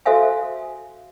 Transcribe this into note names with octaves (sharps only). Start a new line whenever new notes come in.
F#4 A4 C5 E5 F5 G#5